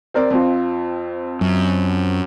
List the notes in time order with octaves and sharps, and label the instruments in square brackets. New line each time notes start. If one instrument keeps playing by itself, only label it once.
[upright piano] C4 A#4 D5
F2 C4 F4
[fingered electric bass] F#2